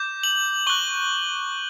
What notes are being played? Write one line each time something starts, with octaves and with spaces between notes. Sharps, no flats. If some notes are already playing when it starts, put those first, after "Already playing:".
Already playing: D6 G6
F#7
C#6 F#6 G7